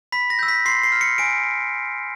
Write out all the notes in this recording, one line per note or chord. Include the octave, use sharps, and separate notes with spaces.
B5 B6
A#6
E6 G6
B6
C6 C7
C7
F6
C#7
G#5 D7